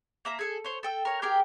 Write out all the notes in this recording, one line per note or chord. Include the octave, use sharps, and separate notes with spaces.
A#3 E5 A#5
G#4 A4 G#5
C5 C#5
A4 G5 E6
A#4 C#5
G4 G#4 A#4 G5